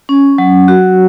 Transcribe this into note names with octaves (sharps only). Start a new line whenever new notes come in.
C#4
F#3
F#4